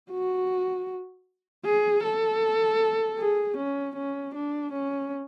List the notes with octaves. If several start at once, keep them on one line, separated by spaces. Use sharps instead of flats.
F#4
G#4
A4
G#4
C#4
C#4
D4
C#4